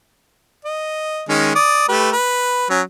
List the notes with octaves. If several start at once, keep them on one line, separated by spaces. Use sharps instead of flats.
D#5
D#3 G#3 C#4
D5 D#6
A3 G4 B4
B4
F#3 C#4